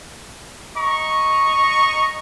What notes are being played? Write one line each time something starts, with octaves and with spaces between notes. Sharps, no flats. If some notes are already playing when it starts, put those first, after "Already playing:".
D#5 A#5 C#6